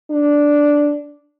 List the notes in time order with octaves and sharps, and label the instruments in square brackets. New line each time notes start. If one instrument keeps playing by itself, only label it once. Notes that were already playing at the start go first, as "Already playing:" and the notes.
[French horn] D4